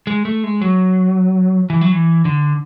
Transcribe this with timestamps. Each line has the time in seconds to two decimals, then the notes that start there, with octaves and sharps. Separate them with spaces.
0.07 G#3
0.25 A3
0.44 G#3
0.62 F#3
1.70 E3
1.81 F#3
1.92 E3
2.25 D3